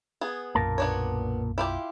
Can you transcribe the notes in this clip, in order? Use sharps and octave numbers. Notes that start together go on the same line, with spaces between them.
B3 G#4
B1 F#2 A#2 A#3 A#4 A5
B3 D4 C#5
E4 F4 G4